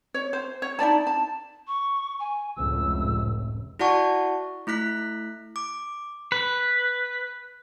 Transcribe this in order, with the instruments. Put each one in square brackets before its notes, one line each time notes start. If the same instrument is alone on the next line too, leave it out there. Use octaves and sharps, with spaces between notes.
[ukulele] C#5
C5
C#5
D#4 E4 D5 A5
A5
[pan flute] C#6
G#5
[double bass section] F1 C#2 A2 [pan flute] E6
[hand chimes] E4 F#4 D5 F#5 A5 C#6
A3 E4 F#6 B6
D6
[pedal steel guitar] B4